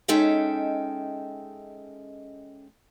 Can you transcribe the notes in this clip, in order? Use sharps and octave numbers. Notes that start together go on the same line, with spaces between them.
G#3 C#4 D#4 A4 E5 G5